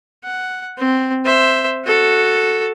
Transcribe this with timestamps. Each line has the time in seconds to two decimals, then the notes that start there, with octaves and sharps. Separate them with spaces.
0.24 F#5
0.78 C4
1.25 C5 E5
1.85 F#4 A4